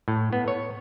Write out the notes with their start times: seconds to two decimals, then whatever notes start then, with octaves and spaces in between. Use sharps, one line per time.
0.08 A2
0.33 B3
0.48 C#5